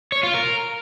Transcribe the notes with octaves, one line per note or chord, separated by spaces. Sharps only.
C#5
F4
A#4